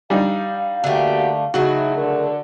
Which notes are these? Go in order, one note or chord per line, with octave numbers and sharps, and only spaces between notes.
G3 D4 D#4 F5
D3 A3 A#3 F#4 G4
C#3 F#3 A3 D#4 E4 F#4
D3 A#4